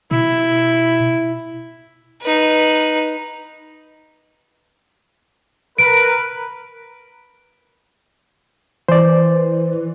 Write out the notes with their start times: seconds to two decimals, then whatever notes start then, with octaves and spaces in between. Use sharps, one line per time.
0.11 B2 E4
2.22 D#4 B4
5.79 A#4 B4 D7
8.89 E3 C5 D5